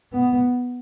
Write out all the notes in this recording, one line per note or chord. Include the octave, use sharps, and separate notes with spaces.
B3